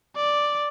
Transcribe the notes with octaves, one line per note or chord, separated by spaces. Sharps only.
D5